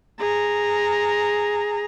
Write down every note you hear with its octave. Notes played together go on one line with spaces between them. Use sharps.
G#4 A#5